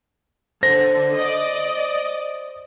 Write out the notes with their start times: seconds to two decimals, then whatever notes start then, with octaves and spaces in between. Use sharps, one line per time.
0.63 D3 C5 A#6
1.17 D5 D#5